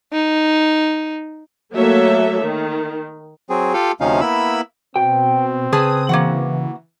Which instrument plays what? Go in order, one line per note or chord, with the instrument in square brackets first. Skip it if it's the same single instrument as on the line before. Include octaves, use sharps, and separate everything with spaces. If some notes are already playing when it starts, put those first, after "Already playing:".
[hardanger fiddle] D#4
[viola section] F#3 A3 A#3 A4 C#5 E5
D#3
[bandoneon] F#3 C4 G#4
F4 G4 A4 F5
D2 C3 F3 C#4 D#4 F5
A#3 B3 E4 B5 E6
[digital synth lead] B2 [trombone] C4 [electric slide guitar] G5
[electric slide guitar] C#3 [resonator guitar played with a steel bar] G#4 B4 A5 [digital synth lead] D#6
[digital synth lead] E3 [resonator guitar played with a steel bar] A#3 F#4 F#5